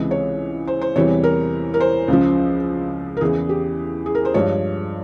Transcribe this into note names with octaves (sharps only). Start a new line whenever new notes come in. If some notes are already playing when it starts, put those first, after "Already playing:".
Already playing: C#2 C3 E3 G#3
C#5
C5
C5
E2 C3 E3 G3 C#5
A#4
A#4
C5
C#2 C#3 F3
A#4
E2 C#3 E3 G#4
G4
G#4
A#4
C5
G2 F3 G#3 C#5